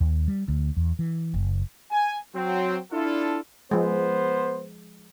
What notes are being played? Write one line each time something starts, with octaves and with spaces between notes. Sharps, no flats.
D#2
G3
D2
E2
E3
F#1
G#5
F#3 C4
D4 E4 F4 A4
F3 G#3 B3 C5